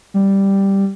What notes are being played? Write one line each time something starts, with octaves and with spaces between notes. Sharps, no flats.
G3